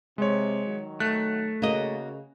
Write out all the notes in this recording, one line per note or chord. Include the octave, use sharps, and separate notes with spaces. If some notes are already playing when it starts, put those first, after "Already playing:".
C3 G#3 C#5
D#3 F#3
A3 F#6
C#3 A#3 F#4 D#5